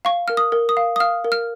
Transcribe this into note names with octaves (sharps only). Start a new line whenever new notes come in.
F5 C#6
A#4 F6
D#6
A#4
D#6
F5
D#6
F5 F6
A#4
F6